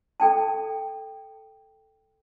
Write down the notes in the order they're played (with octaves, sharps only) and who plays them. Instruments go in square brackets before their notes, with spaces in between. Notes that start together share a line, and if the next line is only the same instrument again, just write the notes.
[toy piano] A4 G5 A5